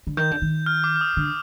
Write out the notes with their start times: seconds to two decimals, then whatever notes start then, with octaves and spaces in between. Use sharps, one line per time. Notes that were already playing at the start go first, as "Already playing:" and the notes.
0.07 D3
0.17 D#3 G6
0.31 D3
0.42 D#3
0.66 F6
0.84 D6
0.96 F6
1.01 D#6
1.17 D3